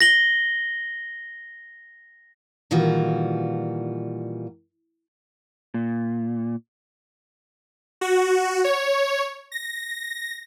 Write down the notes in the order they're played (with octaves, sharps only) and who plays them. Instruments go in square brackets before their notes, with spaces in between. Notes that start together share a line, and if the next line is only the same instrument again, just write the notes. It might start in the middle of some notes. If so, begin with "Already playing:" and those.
[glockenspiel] A#6 F#7 G7
[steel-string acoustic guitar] A#2 D#3 E3 G3 F4 F#4
[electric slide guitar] A#2
[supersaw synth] F#4
C#5
A#6